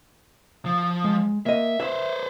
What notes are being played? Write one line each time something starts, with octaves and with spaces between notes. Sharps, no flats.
F3
G#3
A#3 D#5 E5
B4 C5 E5